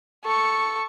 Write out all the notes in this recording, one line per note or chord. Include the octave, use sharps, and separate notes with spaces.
A4 C#6